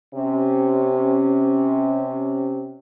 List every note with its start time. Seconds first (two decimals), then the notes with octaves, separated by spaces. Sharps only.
0.15 C3 C#4